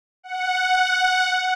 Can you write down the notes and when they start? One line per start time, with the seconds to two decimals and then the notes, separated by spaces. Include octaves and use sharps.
0.23 F#5